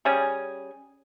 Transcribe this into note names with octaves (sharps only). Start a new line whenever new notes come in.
G3 C#4 G#4